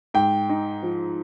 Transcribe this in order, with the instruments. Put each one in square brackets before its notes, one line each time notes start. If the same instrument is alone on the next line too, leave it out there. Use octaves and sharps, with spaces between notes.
[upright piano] G#2 [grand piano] G5
[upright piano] D#4
F3